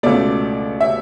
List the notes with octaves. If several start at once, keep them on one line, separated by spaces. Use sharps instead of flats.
C#2 B2 A3 D5
E5